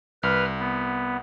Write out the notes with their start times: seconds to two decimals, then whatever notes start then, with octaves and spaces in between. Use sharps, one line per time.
0.23 C2 B4 F6
0.60 B3